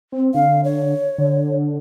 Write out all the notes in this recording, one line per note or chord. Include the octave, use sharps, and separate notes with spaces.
C4
D3 F5
C#5
D3